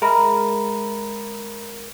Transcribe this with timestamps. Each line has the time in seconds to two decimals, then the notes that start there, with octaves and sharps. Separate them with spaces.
0.02 G#3 A#4 E5 A#5 B5